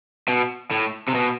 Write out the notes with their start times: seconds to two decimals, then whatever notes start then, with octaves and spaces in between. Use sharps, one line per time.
0.28 B2
0.71 A2
1.08 C3
1.15 B2